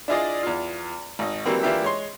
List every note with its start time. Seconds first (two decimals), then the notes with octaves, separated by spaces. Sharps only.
0.08 D4 E4 F4 G#4 D5 D#5
0.43 E2 F4
1.19 G#1 D#5
1.46 E3 F#3 G3 A#3 C4
1.63 E3 A#3 D4 F4 G4 E5
1.82 G#3 C#5 C6